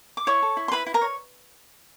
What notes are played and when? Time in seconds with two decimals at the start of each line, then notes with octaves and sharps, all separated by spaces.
0.17 D6
0.27 E4 C#5 C#6
0.42 A4
0.57 E4
0.68 C6
0.72 E4 B4 B5
0.86 E4
0.94 A#4 A#5
1.01 C#5